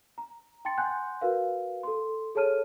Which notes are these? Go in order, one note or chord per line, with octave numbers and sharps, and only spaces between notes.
A#5
G5 A5 C6 A6 C#7
F#5 G#5 C6 F#6 G6
F#4 A#4 B4 F5
A4 C6
G#4 A4 C#5 A5 F6 D#7